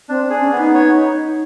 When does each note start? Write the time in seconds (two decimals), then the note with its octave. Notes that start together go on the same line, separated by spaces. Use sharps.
0.09 C4 D4
0.30 C4 G#4
0.40 C#4
0.52 B3
0.58 D#4
0.74 C#5